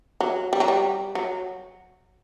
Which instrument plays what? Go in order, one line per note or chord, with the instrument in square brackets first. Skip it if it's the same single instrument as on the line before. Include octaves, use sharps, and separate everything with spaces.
[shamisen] F#3
G3
F#3
G3
F#3